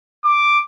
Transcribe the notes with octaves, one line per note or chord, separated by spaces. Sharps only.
D6